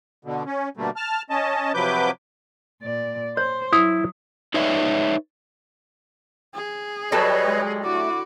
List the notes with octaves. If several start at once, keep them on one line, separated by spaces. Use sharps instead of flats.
B2 D3
C#4
B2 D3 G3 A3 A#3
A5 F6
C#4 D#5 A5
C3 F3 F#3 B4 D6 G6
A#2 D5
C5 C#5
F#3 E4 D#6
D#4 B4 C#5 D5 E5
G#4
F#3 G3 A4 B4 C#5 D#5
G#3
D3 A3 E4 F#4 D6